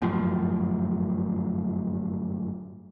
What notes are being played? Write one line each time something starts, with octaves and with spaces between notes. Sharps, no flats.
G1 F#2 A2 F3